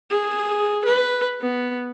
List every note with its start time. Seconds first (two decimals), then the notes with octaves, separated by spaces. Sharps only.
0.10 G#4
0.84 B4
1.41 B3